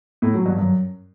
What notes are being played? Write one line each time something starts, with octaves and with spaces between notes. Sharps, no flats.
A2
F#3
G2
F#2